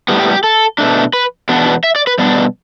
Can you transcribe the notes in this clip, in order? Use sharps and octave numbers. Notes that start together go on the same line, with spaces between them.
A2 G3 B3
G4
G4
A4
B2 A3 D4
B4
E2 B2 B3 D4
E5
D5
B4
B2 G3 B3 D4 D5